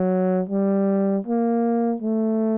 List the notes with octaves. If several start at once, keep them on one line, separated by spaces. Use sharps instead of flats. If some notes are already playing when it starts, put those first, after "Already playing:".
Already playing: F#3
G3
A#3
A3